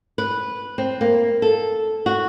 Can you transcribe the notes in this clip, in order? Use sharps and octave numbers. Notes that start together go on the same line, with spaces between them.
B4
C4
A#3
A4
F#4